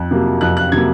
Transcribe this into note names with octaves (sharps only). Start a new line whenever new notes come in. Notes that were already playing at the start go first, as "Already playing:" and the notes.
Already playing: F2 F#6
C3 F#3 A#3
F2 F#6
F#6
C3 F#3 A#3 G#6